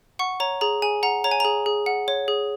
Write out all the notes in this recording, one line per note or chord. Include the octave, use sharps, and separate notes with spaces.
F#5 C#6
C#5 A#5
G#4 A#5
G#4 G#5
F#5 A#5
C#5 A#5
G#5
G#4 A#5
G#4
F#5
C#5
G#4